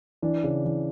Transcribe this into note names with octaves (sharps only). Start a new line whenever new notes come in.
E3 D4
C#3
E3